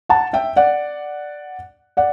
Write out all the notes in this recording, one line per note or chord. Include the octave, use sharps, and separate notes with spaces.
F#5 A5
E5 G5
D5 F#5
D5 F#5